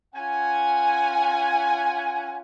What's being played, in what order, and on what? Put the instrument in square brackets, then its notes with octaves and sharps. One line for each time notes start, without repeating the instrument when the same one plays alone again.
[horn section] C#4 F4 F#5 G#5